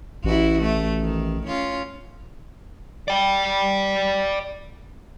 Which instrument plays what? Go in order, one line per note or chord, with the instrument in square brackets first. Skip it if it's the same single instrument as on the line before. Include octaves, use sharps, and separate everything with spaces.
[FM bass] A1 [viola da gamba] E4 F#4
[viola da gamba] A3
D#3
C#4 F4
[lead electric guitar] D5 G5